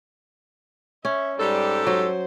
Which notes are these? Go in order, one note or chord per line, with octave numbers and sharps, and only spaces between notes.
C#4 E5
G#2 G3 G4 A4
F#3 C5